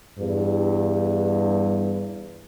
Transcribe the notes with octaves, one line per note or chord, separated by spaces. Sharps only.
E2 G2